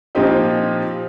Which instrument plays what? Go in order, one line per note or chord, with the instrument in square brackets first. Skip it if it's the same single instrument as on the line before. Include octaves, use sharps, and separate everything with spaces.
[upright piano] A#2 F3 C4 D#4 G4